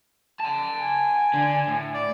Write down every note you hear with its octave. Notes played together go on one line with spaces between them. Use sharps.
F#5 A5
G#5
D3
A2
D5